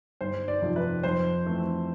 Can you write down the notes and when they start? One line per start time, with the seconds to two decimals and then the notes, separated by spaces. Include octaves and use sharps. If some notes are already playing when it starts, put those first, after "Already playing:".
0.21 G1 C5
0.48 D5
0.62 F2 C3 F3
0.76 B4
1.03 F2 C5
1.45 E3 A3 C4